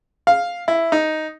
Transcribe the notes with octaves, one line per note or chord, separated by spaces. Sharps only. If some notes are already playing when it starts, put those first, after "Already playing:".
F5
E4
D#4